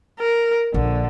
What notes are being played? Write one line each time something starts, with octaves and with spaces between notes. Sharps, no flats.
A#4
A#1 D3